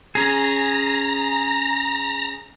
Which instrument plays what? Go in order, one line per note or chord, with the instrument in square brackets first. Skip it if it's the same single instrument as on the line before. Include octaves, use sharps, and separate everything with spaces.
[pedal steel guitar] C#4 G#4 [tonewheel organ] A#5 A#6